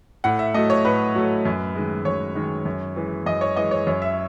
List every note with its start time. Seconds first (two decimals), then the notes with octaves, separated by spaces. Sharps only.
0.24 A2 F#5
0.39 E5
0.54 F#3 A3 D#5
0.70 C#5
0.84 A2 B4
1.15 F#3 A3
1.45 F#2
1.75 D#3 G#3
2.05 F#2 C#5
2.35 D#3 G#3
2.65 F#2
2.96 E3 G#3
3.26 F#2 D#5
3.41 C#5
3.56 E3 G#3 D#5
3.71 C#5
3.87 F#2 C#5
4.02 E5